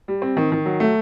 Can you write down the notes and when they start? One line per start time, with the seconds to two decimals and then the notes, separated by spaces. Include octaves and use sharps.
0.08 G3
0.22 C4
0.37 D#3
0.52 D#3
0.66 F#3
0.80 A3